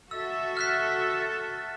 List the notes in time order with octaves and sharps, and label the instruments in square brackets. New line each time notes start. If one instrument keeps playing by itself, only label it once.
[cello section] F#4 A4 E5 [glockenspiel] E6
[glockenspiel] F6 F#6 B6